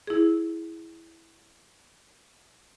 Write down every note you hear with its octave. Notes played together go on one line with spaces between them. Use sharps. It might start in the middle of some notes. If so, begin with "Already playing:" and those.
E4 G#4